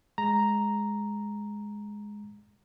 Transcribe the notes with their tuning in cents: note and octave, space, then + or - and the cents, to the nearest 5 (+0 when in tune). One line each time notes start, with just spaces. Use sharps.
G#3 +0 A#5 +0